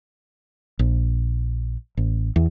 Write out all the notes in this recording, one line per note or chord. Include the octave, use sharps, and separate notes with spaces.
A#1
A1
E2